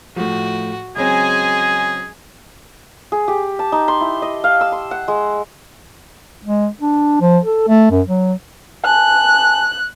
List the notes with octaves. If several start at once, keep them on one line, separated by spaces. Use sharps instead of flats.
A2 F3 F#4
C#3 F#3 G#3 C4 G#4 G#5
G#4
G4
A5
D#4
C6
E4
D#5
F5
E6
C6
F#5
G#3
G#3
D4
F3
A4
A3
F#2
F#3
G#5 A5 F#6